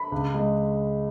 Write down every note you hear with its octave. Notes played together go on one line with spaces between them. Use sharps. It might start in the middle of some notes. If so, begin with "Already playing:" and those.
Already playing: B5
C#2
G#3